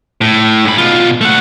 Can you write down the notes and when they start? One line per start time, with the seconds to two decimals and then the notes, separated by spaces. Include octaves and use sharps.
0.21 A2
0.65 G#2 B5
0.78 B2 F4
1.21 A3 F#5